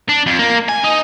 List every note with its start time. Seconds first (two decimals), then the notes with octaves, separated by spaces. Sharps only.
0.09 D4
0.26 F2
0.39 A#3
0.69 G#5
0.84 D#4